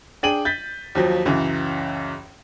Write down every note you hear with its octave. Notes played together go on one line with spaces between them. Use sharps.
D4 G#4 G5 D#7 F#7
G6 A6 B6
D#2 F3 F#3
C#2 F#2 E3